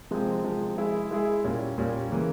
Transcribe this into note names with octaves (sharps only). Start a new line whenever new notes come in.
C3 F3 G#3 C4
C3 F3 G#3 C4
G#3 E4 G#4
G#3 E4 G#4
A#2 G3 C#4
A#2 G3 C#4
C#3 E3 A#3